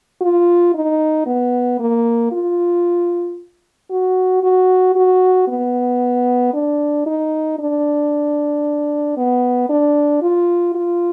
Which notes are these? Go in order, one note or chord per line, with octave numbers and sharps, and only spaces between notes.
F4
D#4
B3
A#3
F4
F#4
F#4
F#4
B3
D4
D#4
D4
B3
D4
F4
F4